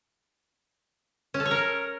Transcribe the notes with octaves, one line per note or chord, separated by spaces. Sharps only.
C#4
A4
C#5
A#4